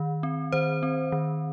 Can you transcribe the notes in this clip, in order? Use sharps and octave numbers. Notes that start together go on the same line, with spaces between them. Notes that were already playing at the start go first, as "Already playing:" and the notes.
Already playing: D#3
C4
D#3 C5
C4
D#3